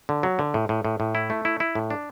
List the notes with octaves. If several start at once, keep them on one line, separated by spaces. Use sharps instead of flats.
D3
F#3
D3
A2
A2
A2
A2
E4
A3
E4
E4
A2
D4